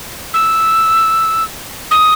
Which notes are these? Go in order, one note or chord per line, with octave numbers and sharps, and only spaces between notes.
E6
D#6